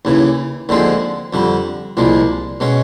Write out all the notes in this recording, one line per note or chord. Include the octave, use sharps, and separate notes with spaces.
D#2 C#3 E3
D#2 D3 F3 G#3 C4
F2 D3 G3
C2 A#2 F3 G#3
B2 G#3 C#4